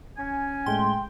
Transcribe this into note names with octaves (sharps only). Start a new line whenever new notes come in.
C#4 G#5
A2 G#3 A3 G5 C6